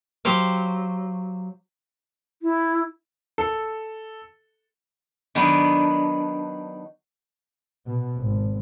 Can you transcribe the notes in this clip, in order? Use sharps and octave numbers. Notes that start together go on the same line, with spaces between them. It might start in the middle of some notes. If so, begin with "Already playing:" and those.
F#3 G4 C5 F5
E4
A4
D#3 F#3 B3 D4
B2
G#1